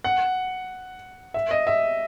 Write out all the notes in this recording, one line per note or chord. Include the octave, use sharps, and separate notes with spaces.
F#5
E5
D#5
E5